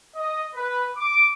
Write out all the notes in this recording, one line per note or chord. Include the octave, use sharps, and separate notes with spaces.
D#5
B4
D6